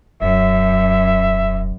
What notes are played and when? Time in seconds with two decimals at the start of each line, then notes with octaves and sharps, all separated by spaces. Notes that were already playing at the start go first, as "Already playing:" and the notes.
0.21 E1 F#2 E5